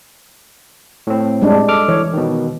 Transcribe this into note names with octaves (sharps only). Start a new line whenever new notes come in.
A2 C4
G3 G#3 D4
A4 D6 F6
E3 C#5
B2 D#3